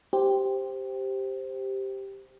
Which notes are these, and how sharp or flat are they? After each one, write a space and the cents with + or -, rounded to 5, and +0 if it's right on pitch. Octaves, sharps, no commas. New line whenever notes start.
G4 +0 C5 +0